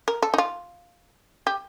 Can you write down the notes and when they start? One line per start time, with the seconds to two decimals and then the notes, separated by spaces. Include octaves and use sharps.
0.08 A#4
0.22 A4
0.34 D#4
0.38 F4
1.47 G4